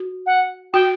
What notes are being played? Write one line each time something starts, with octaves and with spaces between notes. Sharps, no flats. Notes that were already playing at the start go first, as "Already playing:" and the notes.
Already playing: F#4
F#5
F#4 G5